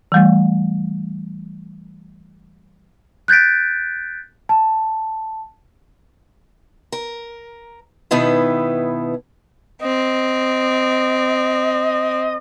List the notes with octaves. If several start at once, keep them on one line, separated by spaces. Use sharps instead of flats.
E3 G3 A3
F#6 G6 A6 B6 D7
A5
A#4
B2 D#3 B3 D#4 E4 B4
C4 D#5